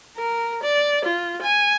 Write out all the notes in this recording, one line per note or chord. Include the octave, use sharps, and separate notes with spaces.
A#4
D5
F4
G#5